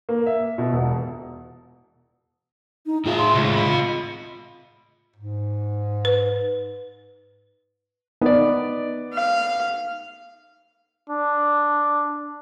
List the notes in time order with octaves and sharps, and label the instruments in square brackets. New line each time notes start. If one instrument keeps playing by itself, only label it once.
[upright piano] A#3
E5
B2
E1
[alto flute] D#4
[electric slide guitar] A2 G#4 E5 [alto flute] F4
[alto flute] C6
[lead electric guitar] C#2 [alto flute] F4
[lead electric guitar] D#5 B5
[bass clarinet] G#2
[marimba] B4
[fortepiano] B3 D5 [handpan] D#4
[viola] F5
[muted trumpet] D4